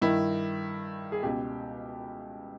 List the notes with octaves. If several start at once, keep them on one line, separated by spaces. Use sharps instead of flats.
G2 D#3 E4
G#4
C#2 B2 G4